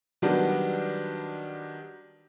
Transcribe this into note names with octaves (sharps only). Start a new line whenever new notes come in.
D#3 F#3 G3 B3 D4